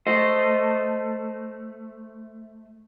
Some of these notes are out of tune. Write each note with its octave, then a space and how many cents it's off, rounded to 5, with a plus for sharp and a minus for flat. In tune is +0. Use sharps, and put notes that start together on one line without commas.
A3 +0 C5 +0 D#5 +0